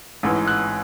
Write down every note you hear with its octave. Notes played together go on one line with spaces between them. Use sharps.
A1 G#2 E3
F#6